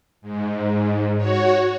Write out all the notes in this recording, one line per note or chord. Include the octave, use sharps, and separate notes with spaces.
G#2
F#4 C#5